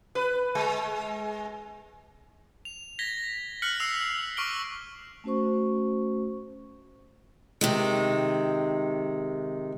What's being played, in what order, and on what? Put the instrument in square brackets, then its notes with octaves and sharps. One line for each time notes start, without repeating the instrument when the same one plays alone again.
[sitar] B4
G#3
[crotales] F7
G#6 A#6 B6 G7
F6 F#6 B6 C#7 F#7
E6 C7 F7
C#6 D6 F6 D7 G7
[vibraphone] A3 C#4 F#4 C5 C#6
[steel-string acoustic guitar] C3 D#3 G#3